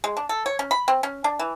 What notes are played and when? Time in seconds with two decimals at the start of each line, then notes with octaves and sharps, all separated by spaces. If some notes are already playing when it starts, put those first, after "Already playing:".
0.04 G#3
0.17 D4
0.29 A4
0.46 C#5
0.59 C#4
0.71 B5
0.88 C4
1.03 C#4
1.24 D4
1.39 E3